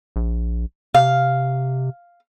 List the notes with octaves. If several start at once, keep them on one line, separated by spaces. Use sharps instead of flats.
A#1
C3 F5